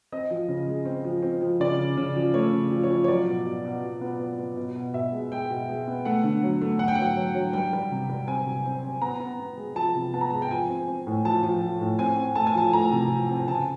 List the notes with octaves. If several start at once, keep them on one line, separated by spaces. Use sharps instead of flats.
C4 D#5
F3
C#3
G#3
C4
F3
C4
F3
C#3 D5
C#3
C#3
F3
A3 C#5
C#3
F3
C#5
F3
C#5
F#3 D5
B2
B2
B2
B2
B3
B3
B3
B2
B2
B2 E5
G#3
G#3 G5
B2
G#3
B3
A3 F#5
D3
F#3
A3
D3 F#5
G5
F#3 F#5
F#3
F#3
G3 G5
G3
C3
G3
C4 G#5
C3
C4
C4
B3 A#5
B3
B3
G#3
F3 A5
C3
B3 A5
A#5
G#3 A5
G5
F3 G#5
C4
C4
A2
F3 A5
F3
F3
A2
C4 G#5
C4
A3 A5
G#5
F3 A5
A3 A#5
C3
F3
C4
C#3 A5
G#5